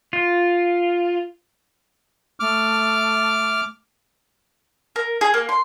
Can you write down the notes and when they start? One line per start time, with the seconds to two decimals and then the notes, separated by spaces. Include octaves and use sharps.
0.13 F4
2.40 A3 D6 F6
4.96 A#4
5.21 G#4
5.34 A#3
5.49 C6